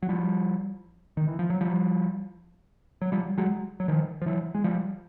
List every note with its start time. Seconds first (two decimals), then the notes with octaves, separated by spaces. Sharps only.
0.02 F#3
0.09 F3 G3
1.17 D#3
1.28 E3
1.39 F3
1.50 F#3
1.61 F3 G3
3.01 F#3
3.12 F3 G3
3.38 F#3 G#3
3.80 F#3
3.88 D#3 F3
4.22 F3
4.26 E3 F#3
4.55 G#3
4.64 F3 G3